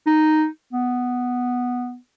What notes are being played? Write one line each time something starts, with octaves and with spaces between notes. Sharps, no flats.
D#4
B3